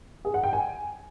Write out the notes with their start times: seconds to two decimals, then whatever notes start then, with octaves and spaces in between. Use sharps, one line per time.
0.25 G#4
0.34 F#5
0.44 G5
0.53 G#5